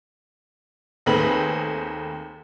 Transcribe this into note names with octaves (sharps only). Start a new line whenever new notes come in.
D#2 A3 C4 G#4 B4 F#7